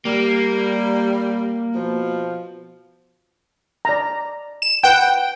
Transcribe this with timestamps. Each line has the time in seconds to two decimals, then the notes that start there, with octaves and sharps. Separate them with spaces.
0.05 G3 A#3
1.74 B2 F3
3.85 D5 A#5
4.62 E7
4.83 B4 F#5 G5